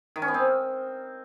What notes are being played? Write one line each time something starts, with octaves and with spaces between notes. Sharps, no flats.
D#3
C#4
B3
C4